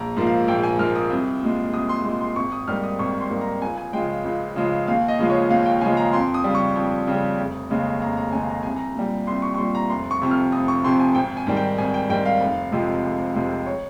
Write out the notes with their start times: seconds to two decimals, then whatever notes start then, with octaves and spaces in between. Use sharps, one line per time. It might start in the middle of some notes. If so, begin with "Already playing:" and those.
Already playing: A#1 A#5
0.17 G#2 F3 A#3
0.27 F5
0.48 A#1 G5
0.63 G#5
0.79 G#2 F3 A#3 F6
0.96 D#6
1.10 C2
1.43 A#2 G#3
1.74 C2 D#6
1.89 C6
2.05 A#2 G#3 C6
2.21 C6
2.36 G#1 C#6
2.52 D#6
2.68 G#2 G3 A#3 F6
2.83 D#6
2.99 G#1 C#6
3.20 C6
3.30 G#2 G3 A#3
3.41 A#5
3.62 C#2 G#5
3.78 G#5
3.93 C#3 F3 G#3 G5
4.24 C#2
4.56 C#3 F3 G#3
4.87 D#2 F5
5.08 D#5
5.19 C#3 F3 G#3
5.30 C#5
5.50 D#2 F5
5.66 G5
5.81 C#3 F3 G#3 G#5
5.97 A#5
6.13 F2 C6
6.34 D#6
6.44 C#3 G3
6.55 C#6
6.76 F2
7.08 C#3 G3
7.38 F1
7.70 D#2 C#3 G#3
8.01 F1 A#5
8.17 A#5
8.32 D#2 C#3 G#3 G#5
8.49 A#5
8.63 C2 G#5
8.76 A#5
8.95 A#2 G3
9.27 C2 C6
9.42 C#6
9.55 C#6
9.58 A#2 G3 C6
9.75 A#5
9.90 F1 C6
10.11 C#6
10.21 F2 C3
10.31 F6
10.52 F1 D#6
10.68 C#6
10.84 F2 C3 C6
11.00 G#5
11.15 G#1 G5
11.37 G#5
11.47 G#2 D#3 G3
11.57 G5
11.78 G#1 G#5
11.94 G5
12.10 G#2 D#3 G3 G5
12.26 F5
12.40 F1
12.72 F2 C3 F3 G#3
13.04 F1
13.35 F2 C3 F3 G#3
13.66 C#5